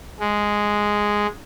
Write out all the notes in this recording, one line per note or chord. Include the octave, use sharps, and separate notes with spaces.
G#3